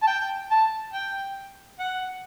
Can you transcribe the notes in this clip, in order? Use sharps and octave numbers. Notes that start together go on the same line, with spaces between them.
A5
G5
A5
G5
F#5